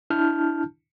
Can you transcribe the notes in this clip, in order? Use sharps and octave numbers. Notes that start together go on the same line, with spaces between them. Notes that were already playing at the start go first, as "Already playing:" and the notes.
D4 E4 A5 F6 G6